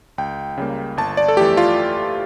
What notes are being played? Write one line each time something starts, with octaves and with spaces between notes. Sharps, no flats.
C#2 G5
C#3 G3 A#3
G1 A5
D5
A4
F2 E3 A3 G4
F4